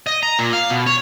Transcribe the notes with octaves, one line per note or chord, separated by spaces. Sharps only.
D#5
A#5
A#2
F5
B2
C#5